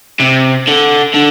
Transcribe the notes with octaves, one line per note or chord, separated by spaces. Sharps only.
C3
D3
D3